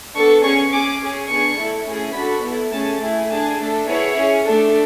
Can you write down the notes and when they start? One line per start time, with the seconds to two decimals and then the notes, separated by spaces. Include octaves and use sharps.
0.14 B3 D4 A4 C#6
0.43 C#4 G#4 C#6
0.72 C#4 G#4 D6
1.00 C#4 G#4
1.29 B3 D4 G#4 C#6
1.58 A3 E4 A4
1.87 A3 C#4 E4 G#4
2.14 D4 F#4 A4 B5
2.44 B3 E4 A4
2.73 A3 C#4 G#4 A5
3.01 A3 E4 G#4
3.30 D4 G#4 A5
3.59 A3 D4 A4
3.87 B3 E4 G#4 C#5
4.16 C#4 G#4
4.44 A3 D4 A4